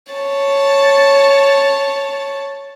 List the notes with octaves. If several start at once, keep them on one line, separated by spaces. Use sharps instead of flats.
C#5 A5